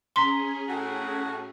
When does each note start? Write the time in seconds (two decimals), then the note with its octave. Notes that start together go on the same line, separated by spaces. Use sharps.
0.16 C#4 G#4 A#5 C6 B6 G7
0.68 A2 F#4